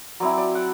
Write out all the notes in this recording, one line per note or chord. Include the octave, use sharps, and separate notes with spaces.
F#3 C4 E4 D5
D5
F#5